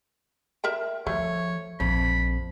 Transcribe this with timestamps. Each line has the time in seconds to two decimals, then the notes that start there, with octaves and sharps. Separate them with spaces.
0.64 A#4 E5 G5
1.07 F3 A3 C#5
1.80 A#1 F2 B5